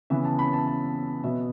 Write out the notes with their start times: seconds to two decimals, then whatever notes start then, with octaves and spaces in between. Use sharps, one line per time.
0.10 C#3 E3 B3 E5
0.25 A5
0.39 B5
0.53 A5
0.67 A5
1.24 B2 B3 E5